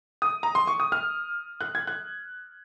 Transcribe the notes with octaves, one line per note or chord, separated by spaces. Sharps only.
D#6
A#5
C6
C#6
D#6
F6
F#6
G#6
F#6